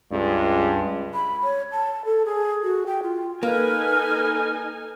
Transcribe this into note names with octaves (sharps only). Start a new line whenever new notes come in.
C#2 G2 G#3
B5
C#5
A5
A4
G#4
F#4
G5
F4
A#3 D#4 A4 B4 G#5 F6